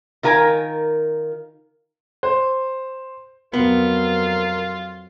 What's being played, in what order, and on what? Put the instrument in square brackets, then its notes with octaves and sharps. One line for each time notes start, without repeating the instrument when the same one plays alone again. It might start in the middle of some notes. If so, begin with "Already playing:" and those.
[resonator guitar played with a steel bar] D#3 F4 A#4 G#5
[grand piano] C5
[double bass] F2 F#3 [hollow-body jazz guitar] B3 [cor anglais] F4 [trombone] A#4